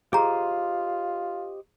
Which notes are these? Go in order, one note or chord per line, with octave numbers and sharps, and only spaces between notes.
F4 G4 G#4 C5 D#5 A#5